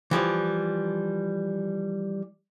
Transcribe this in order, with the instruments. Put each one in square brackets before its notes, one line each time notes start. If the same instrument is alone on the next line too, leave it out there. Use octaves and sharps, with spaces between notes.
[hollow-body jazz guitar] E3 F3 G3 D5